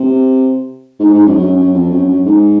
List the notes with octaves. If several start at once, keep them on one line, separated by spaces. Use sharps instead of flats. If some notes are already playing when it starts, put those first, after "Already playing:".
Already playing: C3
G#2
G#2
F#2
F#2
F#2
F2
F#2
F#2
G#2